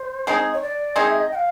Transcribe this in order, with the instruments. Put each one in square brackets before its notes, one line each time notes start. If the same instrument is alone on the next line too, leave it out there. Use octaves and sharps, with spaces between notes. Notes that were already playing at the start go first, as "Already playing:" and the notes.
Already playing: [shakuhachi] C5
[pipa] G#3 C4 D#4 G#4
[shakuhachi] C#5
D5
[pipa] G#3 C4 D#4 G#4 [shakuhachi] D#5
[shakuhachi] E5
D#5
G5
F5